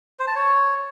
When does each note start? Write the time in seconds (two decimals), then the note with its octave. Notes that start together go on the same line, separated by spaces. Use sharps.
0.19 C5
0.27 A5
0.36 C#5